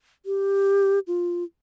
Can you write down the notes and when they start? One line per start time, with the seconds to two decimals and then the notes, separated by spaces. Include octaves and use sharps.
0.26 G4
1.07 F4